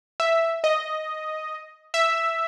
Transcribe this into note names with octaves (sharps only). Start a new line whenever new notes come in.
E5
D#5
E5